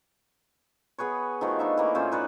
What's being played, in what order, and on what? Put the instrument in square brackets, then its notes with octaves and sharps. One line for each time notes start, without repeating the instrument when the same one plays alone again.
[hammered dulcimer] B3 G#4 B4 C#5
D#3 F3 A3 F#4
D4 D#4 E5
E3 A#3 D6
A2 C#4 F4 C5
D#4 B4 C#5 D5